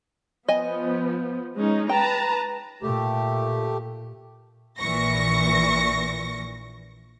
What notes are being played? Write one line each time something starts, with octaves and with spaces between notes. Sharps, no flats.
F3 B3 D#5 G#5
G#3 C#4 D#4
B4 G5 A5 A#5
A#2 A3 G4
A#1 A#2 E3 C#6 A#6